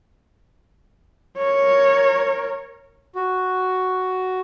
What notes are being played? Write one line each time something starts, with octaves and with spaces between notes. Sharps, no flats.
A#4 C#5
F#4